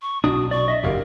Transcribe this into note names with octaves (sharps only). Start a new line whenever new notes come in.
C#6
B1 B2 D4 F#4 D#6
D5 C#6
D#5 E5
F#1 E2 G4 A#4 F5